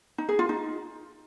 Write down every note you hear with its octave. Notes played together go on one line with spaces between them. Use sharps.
D#4
G#4
F4
D#4